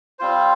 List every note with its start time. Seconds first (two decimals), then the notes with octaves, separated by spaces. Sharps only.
0.19 G3 C4 F4 C5